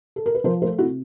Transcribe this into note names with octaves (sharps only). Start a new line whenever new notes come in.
A4
A#4
B4
F3 A#4 C5
A3 A#4 C5
C3 E4 F#4